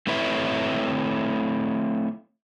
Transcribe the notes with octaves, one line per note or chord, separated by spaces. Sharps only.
A3 C4 E4 B4 C#5 E5